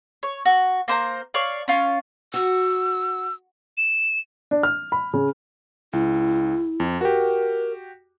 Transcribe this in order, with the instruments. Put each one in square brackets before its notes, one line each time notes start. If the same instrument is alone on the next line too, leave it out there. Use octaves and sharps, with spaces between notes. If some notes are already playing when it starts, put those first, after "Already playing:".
[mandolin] C#5
F#4
A#3 C5 A#5
C#5 D5 F5
C#4 F4
[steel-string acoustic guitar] F#4 [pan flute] E6
[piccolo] E7
[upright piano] D4
F6
B5
C#3
[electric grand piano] C#2 [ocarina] E4
[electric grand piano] F2
[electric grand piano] F#4 G4 [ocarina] A#4